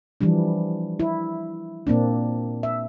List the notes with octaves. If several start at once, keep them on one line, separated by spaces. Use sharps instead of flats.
E3 F3 G3 D4
E4
A#2 A#3 C4 D4
E5